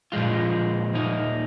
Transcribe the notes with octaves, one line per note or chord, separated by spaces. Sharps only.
A#2 F3 G#3 F4
A#2 A#3 D#4